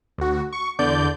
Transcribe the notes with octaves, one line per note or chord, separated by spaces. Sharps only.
D2 F#4
C#6
E2 D3 D5 G6